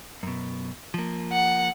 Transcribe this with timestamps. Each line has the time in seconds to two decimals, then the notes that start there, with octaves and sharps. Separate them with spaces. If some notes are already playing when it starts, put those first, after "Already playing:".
0.23 F#2 B2
0.94 F3 A#3
1.33 F#5